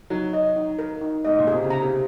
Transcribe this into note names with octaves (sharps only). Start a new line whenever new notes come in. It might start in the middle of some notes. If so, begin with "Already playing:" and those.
F#3 D#4
D#5
D#4
A#4
D#4
G#2 D#5
A#2
C3 G#4
C#3
A#5
C3